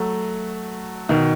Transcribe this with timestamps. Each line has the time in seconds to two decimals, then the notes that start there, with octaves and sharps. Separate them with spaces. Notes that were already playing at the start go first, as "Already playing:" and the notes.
Already playing: F#3 A3
1.09 B2 D#3